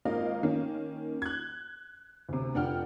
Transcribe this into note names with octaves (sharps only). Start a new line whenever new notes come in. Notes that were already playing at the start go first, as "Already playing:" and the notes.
G#1 A#3 F4 A#4 D#5 F5
D#3 A#3 C#4
F#6 G#6
D2 C3
F1 D4 F4 F#5 G5 F6